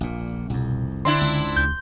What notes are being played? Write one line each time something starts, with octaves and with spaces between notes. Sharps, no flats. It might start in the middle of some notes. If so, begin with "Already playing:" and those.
A#1 A#2
C2 F2 B2
D3 C4 D4 E4 C6
C#2
D2 G6